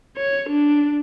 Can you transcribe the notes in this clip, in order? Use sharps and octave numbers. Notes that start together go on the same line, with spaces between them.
C#5
D4